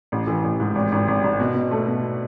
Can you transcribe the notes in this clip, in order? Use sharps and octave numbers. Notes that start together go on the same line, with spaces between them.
A1
E3
A1
G#2
G#1
G#1
G#1
G#1
B2
B2
A3
B2